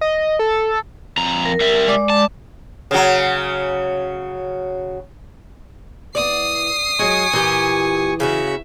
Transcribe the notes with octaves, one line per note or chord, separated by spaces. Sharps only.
D#5
A4
F2 A#5
A#4
G3 E5
G#3 D5 D6
A5
C#3 F#3
E3 B3 D5 D#6 C7
F#3 G#3 D#5 G#5 C#6
A#2 E3 G4
C#3 C#4 F#4 E5